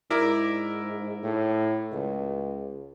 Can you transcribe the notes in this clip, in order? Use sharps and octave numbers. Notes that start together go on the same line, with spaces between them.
G#2 E4 A#4 D5
A2
C#2